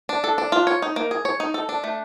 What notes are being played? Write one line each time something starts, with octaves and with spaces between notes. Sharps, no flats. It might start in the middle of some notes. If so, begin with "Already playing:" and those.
D4
A4
D4
F4
C#5
D#4
A#3
G#4
C#5
D#4
A4
D4
A3